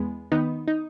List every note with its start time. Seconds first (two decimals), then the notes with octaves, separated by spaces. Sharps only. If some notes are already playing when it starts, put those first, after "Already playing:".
Already playing: E2 G#3 B3
0.32 D#3 B3 D#4
0.68 D#4